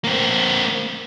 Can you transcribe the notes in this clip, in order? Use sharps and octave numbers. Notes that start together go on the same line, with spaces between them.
A#3 C4